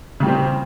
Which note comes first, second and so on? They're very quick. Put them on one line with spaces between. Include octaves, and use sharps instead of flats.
C#3 G3 A#2 C4